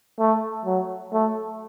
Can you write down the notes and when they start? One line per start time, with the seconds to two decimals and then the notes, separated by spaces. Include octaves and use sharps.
0.19 A3
0.65 F#3
1.13 A3